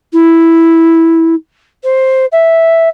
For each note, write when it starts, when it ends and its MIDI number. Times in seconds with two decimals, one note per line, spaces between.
0.13 1.34 64
1.83 2.25 72
2.32 2.88 76